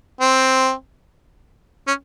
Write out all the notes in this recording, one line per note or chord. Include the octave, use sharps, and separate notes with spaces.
C4
C#4